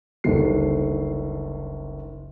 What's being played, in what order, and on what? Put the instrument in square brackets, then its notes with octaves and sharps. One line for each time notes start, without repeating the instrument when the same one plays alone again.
[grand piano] F#1 C#2 D3 D#3 G3 C7